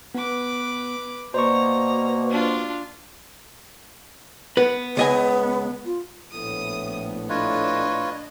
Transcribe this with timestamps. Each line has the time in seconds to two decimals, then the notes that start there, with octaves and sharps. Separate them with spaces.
0.15 B3 B4 D6
1.34 B2 A#3 C5 D5 A#5 C#6
2.30 D4 F4
4.57 B3 B4
4.97 C#2 B3 D#5 G#5
5.85 F4
6.31 A#1 A2 B3 D#6
7.30 D4 F4 B4 C#5 D#5